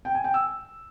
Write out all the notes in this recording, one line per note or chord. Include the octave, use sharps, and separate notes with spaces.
G5
G#5
G5
E6